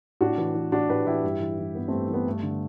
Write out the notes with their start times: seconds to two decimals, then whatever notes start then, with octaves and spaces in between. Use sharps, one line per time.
0.21 A2 D4 F#4
0.38 E3
0.55 E3
0.72 A2 D4 F#4
0.89 A2 G4 B4
1.06 E3 E4 G4
1.24 G2
1.40 E3
1.58 E3
1.75 G2 B3
1.88 G2 A3 C4
2.09 E3
2.14 B3
2.26 G2 A3
2.43 D3